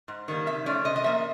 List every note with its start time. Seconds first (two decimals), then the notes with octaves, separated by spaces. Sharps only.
0.08 G#2
0.28 D#3 G3 A#3
0.46 C3 E5
0.66 F3 A3 C#4 D5
0.85 C3 D#5
0.96 D#5
1.04 F3 A#3 E5